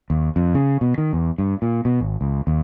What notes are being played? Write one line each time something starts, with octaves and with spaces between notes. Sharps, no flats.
D#2
F2
C#3
B2
D#3
E2
G2
A#2
B2
G#1
C#2
D#2